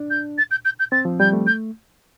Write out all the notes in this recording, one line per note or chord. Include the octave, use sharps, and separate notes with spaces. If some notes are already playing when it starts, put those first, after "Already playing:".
Already playing: D4
G6
A6
G6
G6
G6
C4 A6
F3
G3 G6
A3
G6